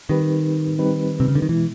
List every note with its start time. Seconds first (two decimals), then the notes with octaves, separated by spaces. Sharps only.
0.09 D#3 G3 C4 D#4 G4 B4
0.79 G3 C4 D#4 G4 B4
1.20 C3
1.28 C#3
1.35 D3
1.42 D#3
1.49 B2 E3 G#3 B3 E4